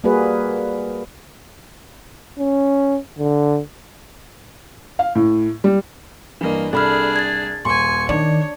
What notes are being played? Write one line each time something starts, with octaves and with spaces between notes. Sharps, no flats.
G3 A#3 F#4 G#4 B4
C#4
D3
F5
A2
G3
G2 E3 A#3 D#5
C2 D4 G#4 A4 B5 F6
G#6 A6
D#1 G#5 C6 C#6
D#3 D4 C#5 D5